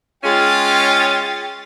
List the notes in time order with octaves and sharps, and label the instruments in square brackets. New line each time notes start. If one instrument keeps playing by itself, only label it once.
[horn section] G#3 C#4 F4 [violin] G5 A6